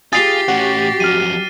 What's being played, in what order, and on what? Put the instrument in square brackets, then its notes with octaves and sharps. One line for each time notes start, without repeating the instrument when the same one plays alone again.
[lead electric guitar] F4 [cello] G4 [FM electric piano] G#4 [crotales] A6 C7
[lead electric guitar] A2 C#4 [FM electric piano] F#4
[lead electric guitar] F#2 F3 [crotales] F6 D#7